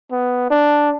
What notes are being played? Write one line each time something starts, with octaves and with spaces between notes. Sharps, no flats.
B3
D4